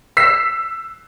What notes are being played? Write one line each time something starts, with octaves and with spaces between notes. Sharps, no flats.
E6 B6 C7